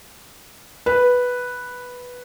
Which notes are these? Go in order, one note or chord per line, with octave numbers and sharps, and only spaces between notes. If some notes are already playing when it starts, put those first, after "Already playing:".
B4